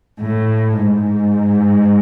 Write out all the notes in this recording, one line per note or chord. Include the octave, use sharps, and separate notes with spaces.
A2
G#2